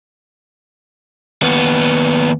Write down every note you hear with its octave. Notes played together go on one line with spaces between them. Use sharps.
D#2 B3